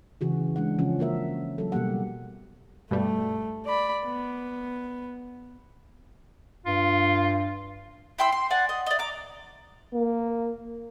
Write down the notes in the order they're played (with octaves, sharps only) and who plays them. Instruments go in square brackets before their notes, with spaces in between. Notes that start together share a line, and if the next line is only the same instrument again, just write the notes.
[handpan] C#3 E3 F#4 G#4
G#3 D4 F#5
C#3 F3 C#4
A#3 F#4 A#4 E5
F#3 A4
B2 G3 A#3 G4 F#5
[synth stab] G2 B2 G3 [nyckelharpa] A3
[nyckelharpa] D5 B5
B3
[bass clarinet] G2 [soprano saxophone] F4
[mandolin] E4 G5 C6 E6
C6
D5 F#5 G#5
D#5
D5 D#5
A#5 D6
[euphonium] A#3